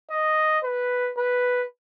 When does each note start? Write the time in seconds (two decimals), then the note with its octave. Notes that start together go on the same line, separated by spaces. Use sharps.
0.10 D#5
0.64 B4
1.17 B4